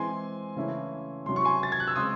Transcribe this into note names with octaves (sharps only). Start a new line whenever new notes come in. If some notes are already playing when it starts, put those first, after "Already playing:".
Already playing: E3 G#3 C4 G#5 C6
C#3 E3 A3 C#4 E4
C3 F#3 C#4 C6
C#6
G#5 C6
A6
G#6
F#6
E6
C#3 G#3 C4 C6 D#6